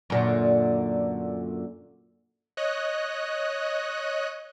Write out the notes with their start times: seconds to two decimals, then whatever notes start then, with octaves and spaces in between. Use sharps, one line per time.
0.10 F#2 A#2 D3
2.57 C#5 D#5 F#6